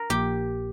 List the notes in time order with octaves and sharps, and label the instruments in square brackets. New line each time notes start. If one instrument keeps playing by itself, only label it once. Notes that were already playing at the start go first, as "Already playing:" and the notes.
Already playing: [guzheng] A#4
[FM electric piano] A#1 A#2 F3 A#3 [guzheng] G4